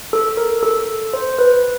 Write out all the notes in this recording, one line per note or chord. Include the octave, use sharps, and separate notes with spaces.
A4
A#4
A4
C5
B4